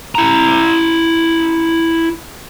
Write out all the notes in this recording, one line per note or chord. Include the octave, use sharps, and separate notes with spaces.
E4 A#5